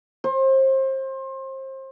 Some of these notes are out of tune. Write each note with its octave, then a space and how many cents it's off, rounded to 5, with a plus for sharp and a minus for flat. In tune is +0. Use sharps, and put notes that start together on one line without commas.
C5 +30